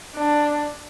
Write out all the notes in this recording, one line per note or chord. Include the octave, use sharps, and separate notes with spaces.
D4